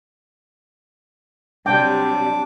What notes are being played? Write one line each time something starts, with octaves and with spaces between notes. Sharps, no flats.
C3 F#3 G3 D4 G5 D6